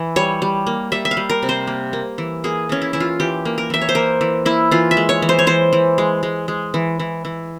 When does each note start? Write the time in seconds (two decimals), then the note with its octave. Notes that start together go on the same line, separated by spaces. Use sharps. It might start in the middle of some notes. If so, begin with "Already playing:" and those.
Already playing: E3
0.16 G3 C#5
0.42 G3
0.67 A#3
0.92 G3 E5
1.05 E5
1.11 F5
1.17 G3
1.30 A#4
1.43 C3
1.49 C5
1.67 A#3
1.93 A#3
2.18 E3
2.44 A#3 G#4
2.69 E3 C#4
2.82 E4
2.93 E3 E4
3.00 F4
3.20 E3 G4
3.45 A#3
3.58 A#4
3.70 E3 E5
3.82 C#5
3.89 C5
3.95 A#3 A#4
4.21 E3
4.46 A#3 E4
4.71 E3 F4
4.91 E5
4.97 G#3
5.09 C#5
5.22 E3
5.29 C5
5.39 C#5
5.47 E3 C5
5.73 E3
5.98 G#3
6.23 G#3
6.48 G#3
6.74 E3
7.00 E3
7.25 E3